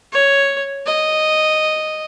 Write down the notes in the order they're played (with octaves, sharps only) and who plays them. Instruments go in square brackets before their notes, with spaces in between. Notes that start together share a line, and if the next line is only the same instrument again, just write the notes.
[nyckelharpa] C#5
D#5